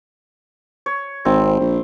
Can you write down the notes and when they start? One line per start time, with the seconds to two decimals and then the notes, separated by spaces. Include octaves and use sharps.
0.86 C#5
1.25 G#1 C4
1.60 A#1